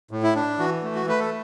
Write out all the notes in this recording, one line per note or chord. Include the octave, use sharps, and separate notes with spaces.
A2
E4
D4
E3 F#4
A3
F#4
A3 B4
A4